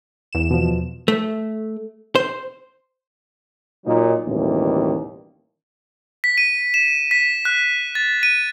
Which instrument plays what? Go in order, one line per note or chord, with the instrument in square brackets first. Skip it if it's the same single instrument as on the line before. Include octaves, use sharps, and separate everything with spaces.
[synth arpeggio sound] E2 E7
[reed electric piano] B2 F3
[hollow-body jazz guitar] A3
C5
[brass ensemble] A#2 F#3 D#4
A1 D#2 B2 D3 E3 G3
[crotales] B6
D#7
E7
B6
F#6
A6
D#7